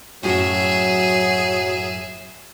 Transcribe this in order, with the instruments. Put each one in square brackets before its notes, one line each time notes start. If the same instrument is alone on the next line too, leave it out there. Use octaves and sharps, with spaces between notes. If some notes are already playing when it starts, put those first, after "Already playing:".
[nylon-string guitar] F#2 A2 F#4 [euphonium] F#3 [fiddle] G#4 E5